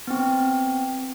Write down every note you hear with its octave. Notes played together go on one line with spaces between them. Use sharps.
B3 C4